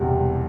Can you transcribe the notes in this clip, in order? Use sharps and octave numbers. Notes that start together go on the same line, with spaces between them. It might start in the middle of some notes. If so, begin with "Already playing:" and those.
Already playing: E1 E2 C3 G3